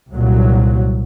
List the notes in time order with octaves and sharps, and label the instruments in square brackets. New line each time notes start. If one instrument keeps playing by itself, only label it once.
[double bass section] C2 A#2 F#3